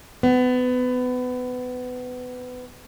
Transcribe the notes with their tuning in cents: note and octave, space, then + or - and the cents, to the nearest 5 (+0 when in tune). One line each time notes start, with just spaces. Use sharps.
B3 +25